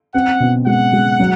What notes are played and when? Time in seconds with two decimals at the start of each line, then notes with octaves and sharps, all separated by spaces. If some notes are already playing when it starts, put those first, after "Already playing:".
0.14 C4 F#5
0.40 B2
0.66 G#3 F#5
0.93 G#3
1.20 F#3